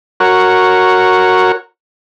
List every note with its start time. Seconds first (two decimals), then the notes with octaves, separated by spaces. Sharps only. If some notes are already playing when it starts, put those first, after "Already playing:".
0.20 F#4 A#4 C#5